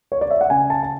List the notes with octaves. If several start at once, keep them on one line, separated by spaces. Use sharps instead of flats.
C#5
D5
E5
F#5
C#3 G#5
A5
A5